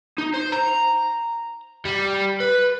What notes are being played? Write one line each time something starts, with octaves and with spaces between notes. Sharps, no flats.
D#4
C5
A#5
G3
B4